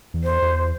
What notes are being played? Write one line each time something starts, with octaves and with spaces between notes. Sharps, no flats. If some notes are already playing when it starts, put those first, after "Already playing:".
E2
C5
E2